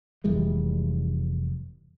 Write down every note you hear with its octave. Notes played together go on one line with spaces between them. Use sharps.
F1 E3 G3 G#3